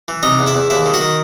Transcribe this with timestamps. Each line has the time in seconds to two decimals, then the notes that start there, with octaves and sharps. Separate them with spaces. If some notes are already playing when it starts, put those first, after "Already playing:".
0.08 E3
0.23 C3 D#4 D#5
0.39 E2
0.47 E4 E5
0.55 E2
0.70 D#2 E4 E5
0.86 D#3
0.94 F#4 F#5
1.01 D#3